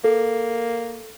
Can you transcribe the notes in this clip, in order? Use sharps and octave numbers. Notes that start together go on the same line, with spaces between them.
A#3 A4